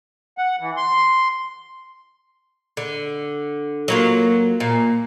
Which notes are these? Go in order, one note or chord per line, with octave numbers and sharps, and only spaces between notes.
F#5
E3
C6
D3
F#3 A#3 F4
A#2